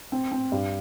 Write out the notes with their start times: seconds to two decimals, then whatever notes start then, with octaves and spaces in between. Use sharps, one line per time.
0.12 C4
0.32 C4
0.52 G2